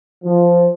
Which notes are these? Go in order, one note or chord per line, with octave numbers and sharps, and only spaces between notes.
F3